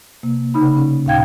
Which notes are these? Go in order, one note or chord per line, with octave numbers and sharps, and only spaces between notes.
C3 A#3
C#3 D#4 B5
C#4
D#2 A#2 D#4 F5 G5 G#6